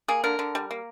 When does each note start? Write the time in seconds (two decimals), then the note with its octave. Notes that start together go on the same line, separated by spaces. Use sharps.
0.08 A#3 G#4
0.24 D3 A#4
0.39 D3
0.55 G3
0.71 A#3